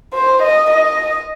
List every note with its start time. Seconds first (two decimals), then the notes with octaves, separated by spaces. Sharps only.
0.14 C5
0.43 D#5
0.71 D#5